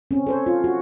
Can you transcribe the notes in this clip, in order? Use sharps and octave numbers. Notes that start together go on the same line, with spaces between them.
C4 C#4
A4 C5 C#5
F4
F#4